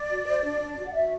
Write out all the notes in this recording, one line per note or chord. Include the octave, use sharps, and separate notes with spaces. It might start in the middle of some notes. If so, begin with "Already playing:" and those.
Already playing: D5
F#4
C5
D4
D4
F#4
F#5
F#4 E5